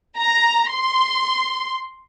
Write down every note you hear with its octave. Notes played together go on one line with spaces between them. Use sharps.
A#5
C6